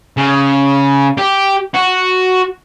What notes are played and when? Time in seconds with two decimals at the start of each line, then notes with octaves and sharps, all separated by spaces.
0.17 C#3
1.18 G4
1.74 F#4